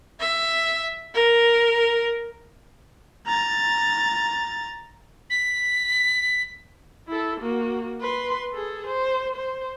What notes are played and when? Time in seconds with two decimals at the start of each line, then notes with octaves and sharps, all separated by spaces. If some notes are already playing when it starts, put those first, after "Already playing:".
0.20 E5
1.15 A#4
3.27 A#5 A6
5.30 B6
7.08 E4 A4
7.40 A#3 F#4
8.01 B4 C6
8.53 G#4 A4
8.86 C5
9.35 C5